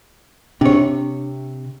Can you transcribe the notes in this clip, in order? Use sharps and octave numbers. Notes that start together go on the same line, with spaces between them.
C3 D4 C#5